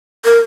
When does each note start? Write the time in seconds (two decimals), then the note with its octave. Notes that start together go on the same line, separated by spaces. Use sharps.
0.25 A#4